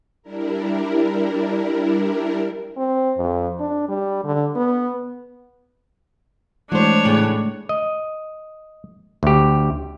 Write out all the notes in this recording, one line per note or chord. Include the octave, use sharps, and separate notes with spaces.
G3 D4 E4 A#4
C4
F2
D4
G3
D3
B3
E3 G#3 A3 D4 F#4 C5 C#5
A2 C#3
D#5
D2 G4